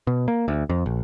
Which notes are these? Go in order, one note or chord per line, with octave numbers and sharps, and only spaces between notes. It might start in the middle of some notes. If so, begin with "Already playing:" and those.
B2
A#3
D2
F2
A#1